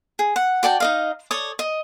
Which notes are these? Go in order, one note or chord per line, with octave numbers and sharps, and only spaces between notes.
G#4
F#5
F#4 D5 G5 A5
D#4 D#5 F5
A4 C#5 D5 D#6
D#5